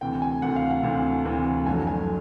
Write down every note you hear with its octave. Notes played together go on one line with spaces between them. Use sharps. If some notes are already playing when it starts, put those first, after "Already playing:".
D2 C3 E3 G5
G#5
D2 C3 E3 F#5
F5
F#5
D2 C3 E3
D2 C3 E3
F#1 F2 D3 F#3 A3 G#5
G#5